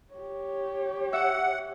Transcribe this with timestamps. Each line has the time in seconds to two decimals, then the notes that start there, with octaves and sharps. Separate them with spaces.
0.14 G4 C#5
1.13 E5 F#5